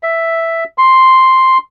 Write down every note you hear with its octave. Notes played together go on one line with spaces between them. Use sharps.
E5
C6